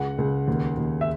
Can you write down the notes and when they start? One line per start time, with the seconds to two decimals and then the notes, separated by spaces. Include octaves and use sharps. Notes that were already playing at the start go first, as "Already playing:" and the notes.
Already playing: C#2 F#5
0.18 C#2
0.48 D#2
0.77 D#2
1.01 E5